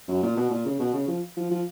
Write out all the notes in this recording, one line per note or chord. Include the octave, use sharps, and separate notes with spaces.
F#2
A#2
B2
A#2
C#3
B2
C#3
F3
F3
F3